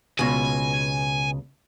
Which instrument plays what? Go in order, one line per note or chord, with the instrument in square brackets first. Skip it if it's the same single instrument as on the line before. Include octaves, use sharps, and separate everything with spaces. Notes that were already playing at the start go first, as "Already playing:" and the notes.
[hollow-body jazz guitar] C#2 B2 [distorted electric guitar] G#5